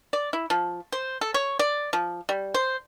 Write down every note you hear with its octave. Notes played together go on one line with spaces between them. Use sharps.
D5
E4
F3
C5
A4
C#5
D5
F3
G3
C5